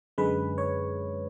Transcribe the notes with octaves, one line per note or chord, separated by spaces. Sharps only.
F#2 D3 G#3 B4
C#5